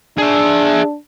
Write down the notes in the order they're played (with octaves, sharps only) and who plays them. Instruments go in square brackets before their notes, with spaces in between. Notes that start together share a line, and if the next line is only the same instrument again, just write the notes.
[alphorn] D4 [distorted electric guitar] G#4 E5